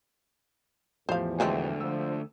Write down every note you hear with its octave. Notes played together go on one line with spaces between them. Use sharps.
E2 A2 F3 G4 C5 F5
D2 G#3 A3 C4
D3 F3 E6